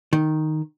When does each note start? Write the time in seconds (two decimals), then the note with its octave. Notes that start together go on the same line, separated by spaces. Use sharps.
0.13 D#3